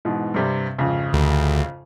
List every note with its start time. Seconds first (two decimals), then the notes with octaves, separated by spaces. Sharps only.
0.05 G#2 B2 E3
0.34 G2 C3 G3
0.78 G#1 F2 C#3
1.13 D2